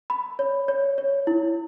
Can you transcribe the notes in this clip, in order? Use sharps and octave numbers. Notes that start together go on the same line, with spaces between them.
B5
C#5
C#5
C#5
E4